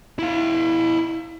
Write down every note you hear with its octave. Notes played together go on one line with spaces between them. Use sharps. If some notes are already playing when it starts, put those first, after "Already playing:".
E4 F5